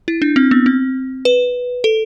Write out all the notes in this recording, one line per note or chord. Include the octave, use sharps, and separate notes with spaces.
E4
D4
C4
B3
C4
B4
A4